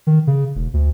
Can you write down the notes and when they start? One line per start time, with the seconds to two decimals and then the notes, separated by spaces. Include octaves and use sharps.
0.07 D#3
0.27 C#3
0.55 E1
0.74 D2